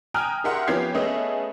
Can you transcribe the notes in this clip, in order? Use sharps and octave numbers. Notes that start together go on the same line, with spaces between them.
G5 G#5 A#5 D#6 F6 F#6
G4 G#4 A#4 E5 F#5 C6
F3 B3 C#4 G4 G#6 C7
A3 B3 C#4 G#4 D#5 E5